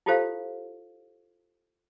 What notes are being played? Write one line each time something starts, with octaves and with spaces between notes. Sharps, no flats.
E4 F4 G4 A4 C5 F5